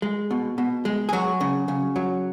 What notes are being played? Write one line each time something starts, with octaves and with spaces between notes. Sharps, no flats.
G#3
B2
B2
G#3
G#4
F#3 F#4
C#3
C#3
F#3